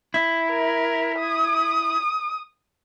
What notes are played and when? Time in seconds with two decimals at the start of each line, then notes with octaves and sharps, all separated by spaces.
0.14 E4
0.50 A#4
1.20 D#6